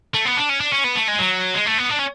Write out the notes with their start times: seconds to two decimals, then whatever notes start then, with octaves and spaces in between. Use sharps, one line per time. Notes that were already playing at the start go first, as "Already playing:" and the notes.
0.15 A3
0.26 B3
0.37 D4
0.50 C#4
0.61 D4
0.73 C#4
0.84 B3
0.96 A3
1.08 G#3
1.19 F#3
1.55 G#3
1.67 A3
1.78 B3
1.90 D4
1.99 C#4